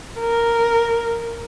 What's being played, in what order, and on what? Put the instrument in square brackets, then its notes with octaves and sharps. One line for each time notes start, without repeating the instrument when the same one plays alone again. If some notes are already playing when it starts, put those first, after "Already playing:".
[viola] A#4